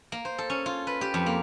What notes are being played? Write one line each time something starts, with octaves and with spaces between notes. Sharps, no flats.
A#3
C5
A4
C#4
F4
B4
G4
F2
A#3